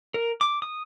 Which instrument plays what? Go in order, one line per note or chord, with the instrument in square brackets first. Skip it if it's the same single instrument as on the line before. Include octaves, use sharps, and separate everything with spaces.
[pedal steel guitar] A#4
D6
D#6